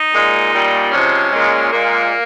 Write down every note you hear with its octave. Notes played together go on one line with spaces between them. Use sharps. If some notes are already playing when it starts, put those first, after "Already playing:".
Already playing: D#4
A#2 G#3
A#2 G3
C3 F3 G#3 C#4
A#2 G#3
A#2 G#3 A#3